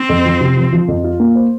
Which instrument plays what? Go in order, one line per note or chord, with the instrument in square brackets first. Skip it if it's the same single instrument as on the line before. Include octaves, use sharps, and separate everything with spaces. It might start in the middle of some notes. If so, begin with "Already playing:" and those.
Already playing: [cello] C4
[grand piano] F2
F3
C3
F3
F3
F2
F4
A#3
C5